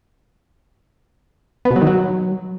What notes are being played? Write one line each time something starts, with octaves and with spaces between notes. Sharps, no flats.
B3
B2
F#3
D#3
F#3